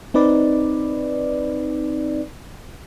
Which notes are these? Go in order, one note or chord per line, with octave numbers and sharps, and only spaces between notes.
C4 D#4 B4 D5